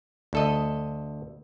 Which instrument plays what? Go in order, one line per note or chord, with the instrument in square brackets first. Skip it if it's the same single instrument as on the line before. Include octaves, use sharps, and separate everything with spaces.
[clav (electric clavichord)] D2 A4 D#5